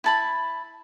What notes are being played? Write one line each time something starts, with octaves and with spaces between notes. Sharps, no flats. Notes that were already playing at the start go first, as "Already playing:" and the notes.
E4 A5 B5